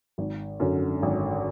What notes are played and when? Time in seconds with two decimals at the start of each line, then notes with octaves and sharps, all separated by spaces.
0.18 G#1
0.60 F#2 D3
1.02 G#1